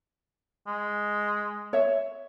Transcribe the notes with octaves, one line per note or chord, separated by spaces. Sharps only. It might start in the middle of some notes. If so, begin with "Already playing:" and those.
G#3
C#5 E5